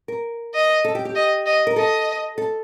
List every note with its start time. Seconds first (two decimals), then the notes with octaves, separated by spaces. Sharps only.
0.08 A#4
0.54 D#5
0.85 A4
0.95 G4
1.05 G4
1.15 D#5
1.46 D#5
1.67 A#4
1.76 A4 D#5
2.38 A4